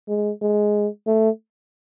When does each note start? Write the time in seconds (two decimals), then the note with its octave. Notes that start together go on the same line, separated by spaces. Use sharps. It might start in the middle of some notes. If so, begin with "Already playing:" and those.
0.08 G#3
0.42 G#3
1.07 A3